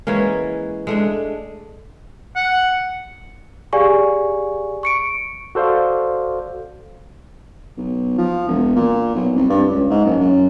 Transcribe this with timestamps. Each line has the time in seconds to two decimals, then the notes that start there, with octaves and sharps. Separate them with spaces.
0.07 E3 G#3 A#3 C#4
0.87 G#3 A3 D4
2.36 F#5
3.73 G4 G#4 D5 F5 G#5 C#6
4.83 C#6 C#7 D7
5.55 F#4 A4 C5 D5 F5
7.77 B1
8.18 F3
8.48 E1
8.76 A#2
9.15 B1
9.35 C2
9.50 G2
9.70 C#2
9.90 G#2
10.05 F#1
10.20 F#2